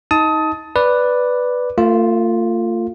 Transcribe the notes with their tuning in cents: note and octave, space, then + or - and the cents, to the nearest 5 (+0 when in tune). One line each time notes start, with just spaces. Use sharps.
D#4 +20 A5 +0 D#6 +25
B4 +0 D5 +0
A3 +40 F4 +0